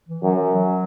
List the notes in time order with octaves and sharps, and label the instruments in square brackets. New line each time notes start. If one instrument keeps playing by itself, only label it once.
[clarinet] E3
[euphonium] F#2 [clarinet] F#3
[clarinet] E3
F#3